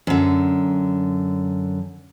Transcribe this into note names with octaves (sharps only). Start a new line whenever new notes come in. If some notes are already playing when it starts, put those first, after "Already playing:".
F#2 D3